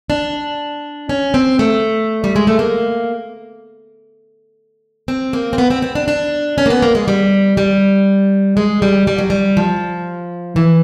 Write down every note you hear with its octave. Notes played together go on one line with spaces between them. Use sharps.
D4
C#4
C4
A3
G3
G#3
A3
A#3
C4
A#3
C4
B3
C4
C4
D4
D4
C#4
A#3
B3
A#3
G#3
G3
G3
G#3
G3
G3
F#3
G3
F3
E3